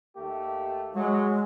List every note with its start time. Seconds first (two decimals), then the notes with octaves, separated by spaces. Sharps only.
0.16 D#2 A3 G4
0.94 F#3 G#3